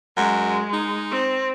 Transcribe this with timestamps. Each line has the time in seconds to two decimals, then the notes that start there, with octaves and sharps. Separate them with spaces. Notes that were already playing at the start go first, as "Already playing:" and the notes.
0.17 F#2 G#3
0.73 D#4
1.11 C4